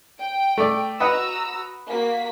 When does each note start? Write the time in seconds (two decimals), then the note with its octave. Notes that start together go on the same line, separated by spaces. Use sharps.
0.20 G5 D7
0.58 A3 D5
1.00 F#4 B4 D#5 F#5 A#5 E6
1.88 A#3 F#4 B6